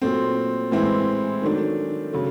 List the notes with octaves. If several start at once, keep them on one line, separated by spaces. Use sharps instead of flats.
A#2 F#3 A3 C4
A2 E3 G#3 C4 E4
D#3 F#3 A3 D4
C#3 F#3 A3